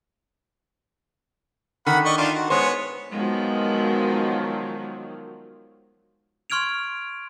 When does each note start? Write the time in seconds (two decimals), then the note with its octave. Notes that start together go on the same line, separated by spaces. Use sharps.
1.86 D3 D#3 F#5 B5
2.05 D5 D#5 C#6
2.17 D4 D#4 F4
2.35 F#4
2.50 G#3 B3 C5 C#5
3.12 D#3 F3 F#3 G#3 B3
6.50 C6 C#6 F6 G#6 D7 F7